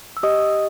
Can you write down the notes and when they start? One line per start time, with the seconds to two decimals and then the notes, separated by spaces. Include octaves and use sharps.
0.17 E6
0.23 G4 D#5 D#6